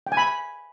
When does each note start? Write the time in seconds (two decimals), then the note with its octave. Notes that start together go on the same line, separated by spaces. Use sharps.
0.07 G5
0.12 G#5
0.17 B5